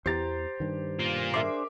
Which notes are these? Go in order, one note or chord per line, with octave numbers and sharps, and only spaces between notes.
E2 E3 B3 G4 C5 A#5 A6
G2 D#3
A#3 F4
D4 G#4 A#4 C5 E5 D6